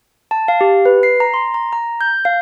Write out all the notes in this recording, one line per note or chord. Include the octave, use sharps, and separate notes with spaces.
A5
F5
G4
B4
C7
A#5
C6
A#5
A#5
G6
F5